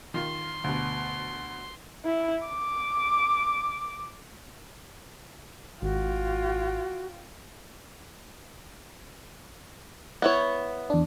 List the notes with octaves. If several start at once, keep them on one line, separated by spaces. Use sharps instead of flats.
D#3 F4 C6
D2 B2
E4
D6
G#1 F4 F#4 G5
B3 E4 C#5
E2 D4